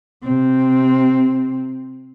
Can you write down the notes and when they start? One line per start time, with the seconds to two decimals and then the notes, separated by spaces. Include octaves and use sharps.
0.23 C3 C4